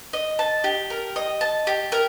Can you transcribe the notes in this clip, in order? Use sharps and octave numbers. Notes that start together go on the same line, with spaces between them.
D#5
A5
G4
A#4
D#5
A5
G4
A#4